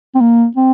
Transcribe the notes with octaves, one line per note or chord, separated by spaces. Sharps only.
C4
A#3
C4